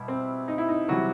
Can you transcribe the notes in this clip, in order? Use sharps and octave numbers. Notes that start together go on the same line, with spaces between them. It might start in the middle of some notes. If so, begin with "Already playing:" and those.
Already playing: B2 G3 E4
C4
D#4
E4
D#4
C3 E3 F#3 G3 F#4